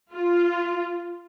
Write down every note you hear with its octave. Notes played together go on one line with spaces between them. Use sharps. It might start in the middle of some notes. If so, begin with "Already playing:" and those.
F4